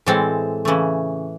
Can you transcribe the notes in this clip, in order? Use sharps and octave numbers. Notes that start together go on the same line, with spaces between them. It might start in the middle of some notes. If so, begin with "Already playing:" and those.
A2 E3 G#3 C4 A4
C#3 E3 A3